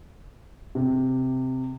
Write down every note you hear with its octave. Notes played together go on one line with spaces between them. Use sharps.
C3